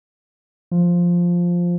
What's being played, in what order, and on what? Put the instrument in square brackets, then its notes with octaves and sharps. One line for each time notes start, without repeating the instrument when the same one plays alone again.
[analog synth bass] F3